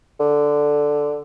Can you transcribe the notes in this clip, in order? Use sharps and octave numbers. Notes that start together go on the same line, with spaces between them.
D3